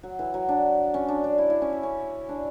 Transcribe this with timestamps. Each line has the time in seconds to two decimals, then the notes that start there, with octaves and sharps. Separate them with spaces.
0.03 F#3
0.19 E3
0.34 F#3
0.49 D4
0.94 C#4
1.08 D4
1.24 D4
1.38 E4
1.50 E4
1.62 C#4
1.73 E4
1.83 C#4
2.29 D4